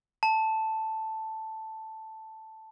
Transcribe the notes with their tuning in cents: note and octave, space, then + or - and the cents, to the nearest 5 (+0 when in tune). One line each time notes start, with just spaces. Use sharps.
A5 +0